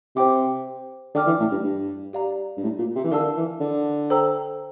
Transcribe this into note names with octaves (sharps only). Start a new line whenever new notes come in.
C3 C5 G5 D6
D3 D5 G5 D6 F6
E3
A2
G2
G2
G4 D5 F5 A#5
G2
A2
A#2
C3
E3
D3 A#4 F5 A5 E6
E3
D3
A4 C5 G5 A#5 E6